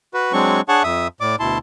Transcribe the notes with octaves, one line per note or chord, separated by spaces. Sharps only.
F#4 B4
F#3 G#3 C4 D4 C#6
D4 G#4 C#5 F#5 A5 C#6
F2 E5 D#6
A2 D5 D6
D2 B2 E4 A5 C6